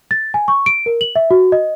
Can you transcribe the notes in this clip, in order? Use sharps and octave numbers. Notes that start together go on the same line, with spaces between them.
A6
G#5
C#6
D7
A#4
F#7
E5
F#4
D#5